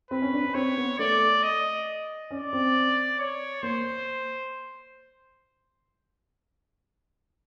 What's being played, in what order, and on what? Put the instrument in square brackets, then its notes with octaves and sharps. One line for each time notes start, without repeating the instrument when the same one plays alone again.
[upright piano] C4 [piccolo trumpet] B4
[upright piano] C#4
D4
C#4
[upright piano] C4 [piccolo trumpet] C#5
[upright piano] B3
[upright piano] A3 [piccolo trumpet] D5
[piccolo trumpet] D#5
[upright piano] C#4 [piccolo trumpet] D5
[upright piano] C4
[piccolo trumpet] C#5
[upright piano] A#3 [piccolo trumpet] C5